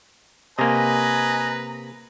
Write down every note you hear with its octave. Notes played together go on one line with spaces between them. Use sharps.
C3 A#3 B4 D#5 G#5 A#5